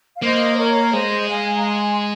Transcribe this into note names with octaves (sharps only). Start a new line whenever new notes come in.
F5
A#3 C5 D#5
A#4 C#5
G#3 C5 D#5
F5 G#5
A#5
G#5 C6